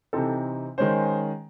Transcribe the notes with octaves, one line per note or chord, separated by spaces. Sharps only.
C3 E3 C4 D#4 A4
D#3 G#3 C#4 C5